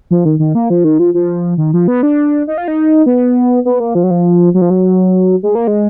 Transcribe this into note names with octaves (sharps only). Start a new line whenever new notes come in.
F3
D#3
D#3
A#3
F3
D#3
F3
F3
D#3
F3
B3
D4
D#4
F4
D#4
B3
B3
A#3
F3
F#3
F3
F#3
F3
F#3
G#3
A#3
G#3